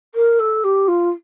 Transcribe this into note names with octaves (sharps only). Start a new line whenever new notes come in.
A#4
A4
G4
F4